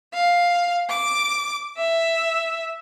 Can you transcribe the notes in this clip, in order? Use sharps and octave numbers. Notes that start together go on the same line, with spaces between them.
F5
D6
E5